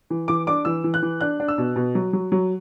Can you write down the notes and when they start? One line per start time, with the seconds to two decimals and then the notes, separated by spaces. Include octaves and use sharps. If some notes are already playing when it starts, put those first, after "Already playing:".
0.10 E3
0.28 E3 D6
0.47 D4 D6
0.65 E3 E6
0.84 E3
0.94 F#6
1.02 E3
1.21 D4 F#6
1.40 D4
1.48 E6
1.58 B2
1.76 B2
1.95 F#3
2.13 F#3
2.32 F#3